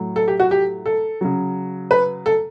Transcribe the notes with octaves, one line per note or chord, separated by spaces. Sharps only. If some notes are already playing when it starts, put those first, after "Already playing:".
Already playing: A2 F#3
A4
G4
F#4
G4
A4
C#3 F#3
B4
A4